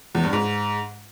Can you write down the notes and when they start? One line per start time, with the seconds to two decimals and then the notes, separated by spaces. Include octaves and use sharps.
0.15 E2
0.24 G2
0.33 G#2